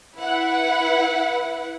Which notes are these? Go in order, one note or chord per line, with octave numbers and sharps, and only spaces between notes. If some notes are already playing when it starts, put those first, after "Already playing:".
E4 B4 F#5